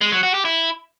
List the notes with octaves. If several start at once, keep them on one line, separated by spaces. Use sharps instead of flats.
G#3
F#3
F#4
G4
E4